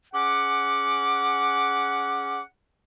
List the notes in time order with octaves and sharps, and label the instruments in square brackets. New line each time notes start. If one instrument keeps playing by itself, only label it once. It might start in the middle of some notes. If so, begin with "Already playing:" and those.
[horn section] C#4 G#4 F#5 [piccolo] D6